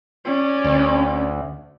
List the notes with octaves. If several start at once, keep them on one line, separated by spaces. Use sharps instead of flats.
C#4 D5
D2